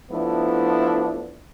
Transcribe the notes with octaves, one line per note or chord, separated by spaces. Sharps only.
F3 A3 B3 D4 E4